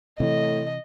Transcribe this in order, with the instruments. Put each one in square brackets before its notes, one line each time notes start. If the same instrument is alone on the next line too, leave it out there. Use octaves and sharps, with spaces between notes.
[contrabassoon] A2 [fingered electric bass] C3 E3 [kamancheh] D#5